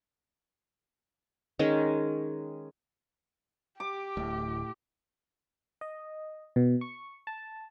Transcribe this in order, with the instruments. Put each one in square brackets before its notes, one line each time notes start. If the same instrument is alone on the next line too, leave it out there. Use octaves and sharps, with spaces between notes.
[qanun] D#3 G#3 C#4
[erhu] G4 [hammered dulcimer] D6
[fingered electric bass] D1 [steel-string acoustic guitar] A2
[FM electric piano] D#5
B2
C#6
A5